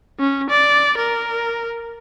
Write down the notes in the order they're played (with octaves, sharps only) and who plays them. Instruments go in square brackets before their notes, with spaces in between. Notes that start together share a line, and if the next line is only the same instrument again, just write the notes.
[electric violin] C#4
D5
A#4